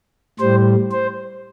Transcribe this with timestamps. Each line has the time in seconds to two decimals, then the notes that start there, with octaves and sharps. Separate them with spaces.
0.39 A2 G3 C5
0.91 C5